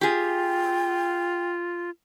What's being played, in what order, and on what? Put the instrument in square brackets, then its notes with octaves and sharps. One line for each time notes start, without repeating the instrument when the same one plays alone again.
[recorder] F4 [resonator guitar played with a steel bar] G4 G#4 [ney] G5